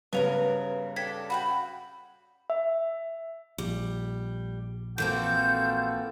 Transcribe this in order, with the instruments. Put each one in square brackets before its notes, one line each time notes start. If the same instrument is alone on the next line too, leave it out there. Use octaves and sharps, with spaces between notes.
[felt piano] G2 C#3 [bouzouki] B3 C#4 A#4 [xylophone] B4 F7
[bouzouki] D4 A4 G5 [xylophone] G#6 B6
[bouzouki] F#4 F#5 G5 [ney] B5
[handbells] E5
[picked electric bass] A#1 [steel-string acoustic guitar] G3
[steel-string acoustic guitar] E3 A#3 C4 [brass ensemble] F4 F#4 A4 [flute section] G6